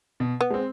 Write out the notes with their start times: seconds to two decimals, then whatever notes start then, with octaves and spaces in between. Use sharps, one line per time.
0.20 B2
0.41 B3
0.50 G#3 C4